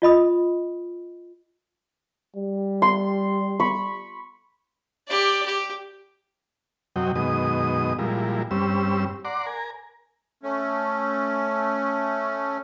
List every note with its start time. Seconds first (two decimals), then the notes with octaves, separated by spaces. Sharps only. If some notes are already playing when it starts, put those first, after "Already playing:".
0.02 F4 D#5 B5 D#6
2.36 G3
2.82 C6
3.60 B5 C#6
5.08 G4 D5
5.45 G4
6.96 F#2 C3 F#3 D#5 G5
7.15 F#2 B2 D#3 G#3 D#5 D#6
7.99 A#2 F3 G3 G#3 E4 A#4
8.51 G2 G3 C4 C#4 E6
9.25 D5 F#5 A#5 C6 D6
9.46 A#4 G#5 A#5
10.43 A3 C#4